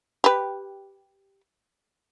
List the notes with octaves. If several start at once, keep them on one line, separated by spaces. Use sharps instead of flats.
G4 B4